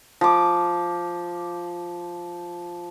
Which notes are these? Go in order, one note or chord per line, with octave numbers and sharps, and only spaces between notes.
F3 D6